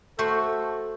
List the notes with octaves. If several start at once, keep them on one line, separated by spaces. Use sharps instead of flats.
A3 F#4 A4 C5